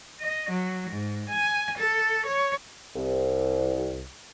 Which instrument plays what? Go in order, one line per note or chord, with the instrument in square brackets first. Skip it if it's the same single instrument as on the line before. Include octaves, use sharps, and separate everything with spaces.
[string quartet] D#5
F#3
G#2
G#5
A4
C#5
[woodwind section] C2